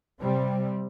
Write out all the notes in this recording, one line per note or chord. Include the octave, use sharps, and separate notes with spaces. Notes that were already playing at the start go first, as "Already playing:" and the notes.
C3 G3 C4